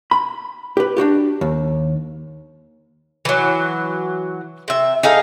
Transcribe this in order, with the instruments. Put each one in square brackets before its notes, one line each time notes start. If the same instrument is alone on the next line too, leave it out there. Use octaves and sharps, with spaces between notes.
[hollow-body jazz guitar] B5
G4 B4
D4 D#4 F#4 G4
D#2
[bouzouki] E3 F#3
C3 E5
D#4 G#4 A4 F5